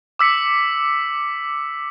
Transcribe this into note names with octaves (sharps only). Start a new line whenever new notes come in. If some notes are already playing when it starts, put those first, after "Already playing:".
D6 E6 B6 C#7